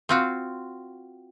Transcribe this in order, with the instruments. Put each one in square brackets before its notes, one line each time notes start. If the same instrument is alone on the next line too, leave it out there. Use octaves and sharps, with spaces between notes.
[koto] C4 F4 F#4